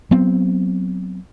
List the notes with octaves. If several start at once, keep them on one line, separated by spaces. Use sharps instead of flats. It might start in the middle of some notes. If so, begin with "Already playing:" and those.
F#3 B3 C4